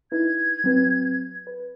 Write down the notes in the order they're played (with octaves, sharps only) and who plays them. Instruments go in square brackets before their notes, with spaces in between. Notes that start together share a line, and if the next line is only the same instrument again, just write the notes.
[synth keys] D#4 E4 B4 [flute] G#6
[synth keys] F#3 C4 B4
B4